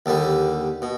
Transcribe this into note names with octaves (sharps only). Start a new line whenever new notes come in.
D#2 D3 G3
B2